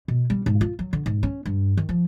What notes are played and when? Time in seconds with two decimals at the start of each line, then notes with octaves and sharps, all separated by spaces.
0.08 B2
0.30 G3
0.46 G#2
0.61 F4
0.79 F#3
0.93 D3
1.06 G#2
1.23 C#4
1.45 G2
1.77 D#3
1.89 F3